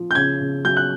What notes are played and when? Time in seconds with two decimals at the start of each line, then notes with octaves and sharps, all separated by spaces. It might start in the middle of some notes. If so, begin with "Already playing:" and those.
Already playing: F3
0.11 G6
0.15 C#3 G#6
0.40 C#3
0.65 F#3 G6
0.77 F#6